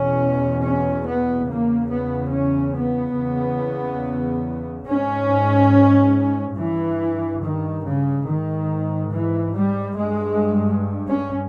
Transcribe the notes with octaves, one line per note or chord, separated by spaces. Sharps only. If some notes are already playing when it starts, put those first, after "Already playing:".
Already playing: E2 B2 C#4
C#4
B3
E2 C#3 A#3
B3
C#4
B3
E2 C#3
G#2 C#4
G2 E3
D#3
C#3
G#2 D#3
E3
G3
G2 G#3
C#4